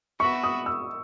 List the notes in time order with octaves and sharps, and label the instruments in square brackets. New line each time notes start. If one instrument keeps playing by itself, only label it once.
[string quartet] B3 F#4 B4 E5 [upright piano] C#6
[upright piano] D#6
E6